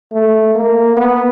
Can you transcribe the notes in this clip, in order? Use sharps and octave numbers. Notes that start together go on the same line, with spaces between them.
A3
A#3
B3